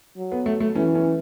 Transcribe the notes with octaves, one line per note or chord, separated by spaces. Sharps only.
F#3
B3
A3
A3
E3 C#4
C#4